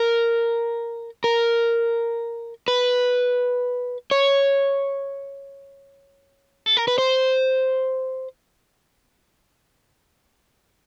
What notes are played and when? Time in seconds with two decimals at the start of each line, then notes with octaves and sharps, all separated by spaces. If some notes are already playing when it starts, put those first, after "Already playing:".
Already playing: A#4
1.24 A#4
2.68 B4
4.11 C#5
6.66 A4
6.77 A#4
6.88 B4
6.98 C5